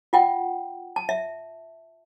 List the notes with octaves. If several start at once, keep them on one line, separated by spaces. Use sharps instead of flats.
F4 F#5 G5
A5
E5